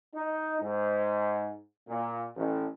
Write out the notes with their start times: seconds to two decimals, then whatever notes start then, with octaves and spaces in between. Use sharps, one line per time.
0.15 D#4
0.61 G#2
1.88 A#2
2.36 A1